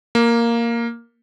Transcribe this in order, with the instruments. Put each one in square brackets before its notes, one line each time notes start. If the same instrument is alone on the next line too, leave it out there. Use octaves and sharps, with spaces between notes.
[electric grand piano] A#3